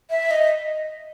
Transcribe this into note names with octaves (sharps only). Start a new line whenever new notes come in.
E5
D#5